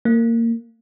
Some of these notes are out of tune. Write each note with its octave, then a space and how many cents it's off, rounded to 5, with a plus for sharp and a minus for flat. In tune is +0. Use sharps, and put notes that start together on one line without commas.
A#3 -20